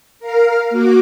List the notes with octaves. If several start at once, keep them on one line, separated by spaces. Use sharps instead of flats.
A#4 F5
A#3 F#4 D6